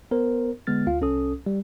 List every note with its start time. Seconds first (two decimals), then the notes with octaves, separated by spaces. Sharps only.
0.11 B3 A#4 C5
0.67 D3 G#3 B3 F6 A6
0.87 D2 F4 F5
1.01 C2 C#4 A4 D#6
1.46 G3